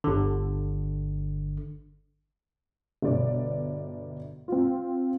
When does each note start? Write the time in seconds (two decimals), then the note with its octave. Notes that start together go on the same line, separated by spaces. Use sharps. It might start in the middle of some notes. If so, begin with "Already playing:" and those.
0.04 G1 D3
3.02 G1 B2 D5
4.48 C4 F4